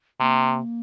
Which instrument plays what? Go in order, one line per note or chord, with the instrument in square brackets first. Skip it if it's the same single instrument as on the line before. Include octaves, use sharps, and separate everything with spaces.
[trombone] C3 [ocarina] A#3